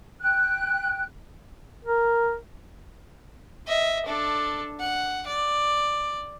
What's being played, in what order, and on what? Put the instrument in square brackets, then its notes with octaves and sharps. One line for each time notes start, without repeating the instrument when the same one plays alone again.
[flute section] G5 F#6
[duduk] A#4
[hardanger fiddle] D#5 E5
D4 A4
F#5
D5